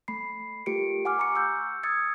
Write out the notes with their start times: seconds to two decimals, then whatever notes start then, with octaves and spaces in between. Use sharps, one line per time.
0.08 A3 B5 C7
0.66 A3 F4 G4 A#4 C#7 D7
1.05 F#5 G#5 D6 F6
1.19 A#5 C#6 C#7
1.35 E6 F6 G6
1.83 D#6 E6 G#6 A6 C#7